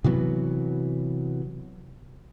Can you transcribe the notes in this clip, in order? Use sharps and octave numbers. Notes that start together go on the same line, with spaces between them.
C3 E3 F#3 B3